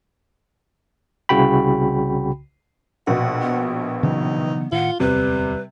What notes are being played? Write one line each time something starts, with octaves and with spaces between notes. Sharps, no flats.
C2 C#3 F#4 G5 B5
A#1 B2 F#5
B3
C#3 E3 F#3 D#4
A2 D#3 F4 F#5
D1 E2 C3 G3 B4